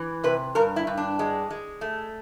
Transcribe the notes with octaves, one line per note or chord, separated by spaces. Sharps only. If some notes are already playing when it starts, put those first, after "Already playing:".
Already playing: E3
C3 B4
G2 A#4
E4
G2
D4
G#3
G#3
A3